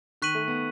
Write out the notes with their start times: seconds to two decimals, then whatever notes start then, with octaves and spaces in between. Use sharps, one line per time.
0.22 D#3 C#6 F#6 B6 D#7 F#7
0.35 A3
0.48 B3